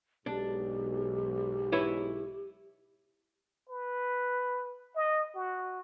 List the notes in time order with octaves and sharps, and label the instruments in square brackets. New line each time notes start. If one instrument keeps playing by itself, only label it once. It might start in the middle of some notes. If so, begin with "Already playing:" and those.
[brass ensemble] B1 G#2 G#3 [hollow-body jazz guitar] D4 [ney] G4
[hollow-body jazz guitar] E4 B4 C#5
[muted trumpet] B4
D#5
F#4